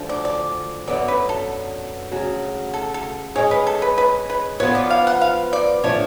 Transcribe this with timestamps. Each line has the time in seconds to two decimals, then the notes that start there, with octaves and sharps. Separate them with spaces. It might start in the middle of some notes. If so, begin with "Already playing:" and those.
Already playing: D2 D3 F3
0.09 D5
0.25 D5
0.88 F#2 D3 F#3 B3 D5
1.08 B4
1.29 A4
2.12 D2 C#3 F#3
2.74 A4
2.94 A4
3.36 G#3 C#4 G#4 C#5
3.51 B4
3.67 A4
3.82 B4
3.98 B4
4.30 B4
4.60 F3 B3 F4 B4 C#5
4.75 D5
4.91 F5
5.07 F#5
5.22 F5
5.53 D5
5.84 D3 F3 A3 D4 C#5